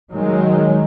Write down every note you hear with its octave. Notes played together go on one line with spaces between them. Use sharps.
D#3 F#3 G#3